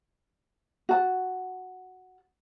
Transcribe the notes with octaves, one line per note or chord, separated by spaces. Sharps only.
F#4 A5